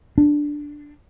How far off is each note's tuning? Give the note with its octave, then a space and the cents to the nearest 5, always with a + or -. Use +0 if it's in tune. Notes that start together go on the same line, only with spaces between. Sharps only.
D4 +0